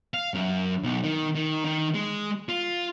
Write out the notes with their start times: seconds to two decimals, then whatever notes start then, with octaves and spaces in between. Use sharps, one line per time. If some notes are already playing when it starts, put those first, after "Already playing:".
0.14 F5
0.34 F#2
0.83 B1
1.04 D#3
1.35 D#3
1.65 D#3
1.94 G#3
2.49 F4